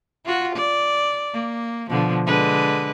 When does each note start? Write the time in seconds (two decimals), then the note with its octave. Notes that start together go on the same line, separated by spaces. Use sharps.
0.25 F4 F#4
0.55 D5
1.33 A#3
1.90 B2 D3 F3
2.25 D3 G#3 B4